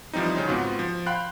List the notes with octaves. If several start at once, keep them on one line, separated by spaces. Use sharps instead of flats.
E3 F3 G3 C4 D#4
C#3 C#4 D#4 C5
G#2 B2 B3 C4 F4 F#4
F3
F5 G5 B5 C6 F#6